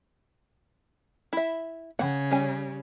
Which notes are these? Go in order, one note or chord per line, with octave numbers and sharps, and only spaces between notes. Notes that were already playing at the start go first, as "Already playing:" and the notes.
E4 E5
C#3 F#5
G3 C#4 G#5